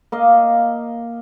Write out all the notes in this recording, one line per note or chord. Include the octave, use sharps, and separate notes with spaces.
A#3 D#5 F5